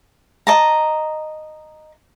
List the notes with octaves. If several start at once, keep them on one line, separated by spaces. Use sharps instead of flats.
D#5 A5 A#5